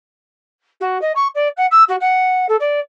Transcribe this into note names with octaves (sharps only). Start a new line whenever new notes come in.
F#4
D#5
C#6
D5
F#5
E6
F#4
F#5
A4
D5